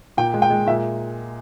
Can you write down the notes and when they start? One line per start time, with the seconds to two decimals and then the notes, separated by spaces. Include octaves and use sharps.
0.17 A#2 G5
0.34 G#3
0.42 G5
0.50 G#3
0.67 A#2 E5